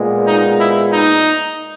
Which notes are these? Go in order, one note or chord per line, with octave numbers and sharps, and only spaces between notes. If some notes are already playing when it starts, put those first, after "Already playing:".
Already playing: A#2 G#3 B3
D#4
E4
D#4